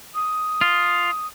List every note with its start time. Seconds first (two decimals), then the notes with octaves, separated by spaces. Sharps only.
0.15 D#6
0.61 F4